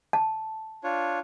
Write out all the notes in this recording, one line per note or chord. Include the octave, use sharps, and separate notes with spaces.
A5
D4 F4 C#5